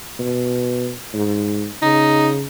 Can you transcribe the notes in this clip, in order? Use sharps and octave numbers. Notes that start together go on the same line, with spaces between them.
B2
G#2
C#3 D#4